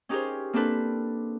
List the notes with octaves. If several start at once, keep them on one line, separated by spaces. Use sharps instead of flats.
C#4 D#4 G4 G#4 A#4 C5
A#3 C4 D4 A4 B4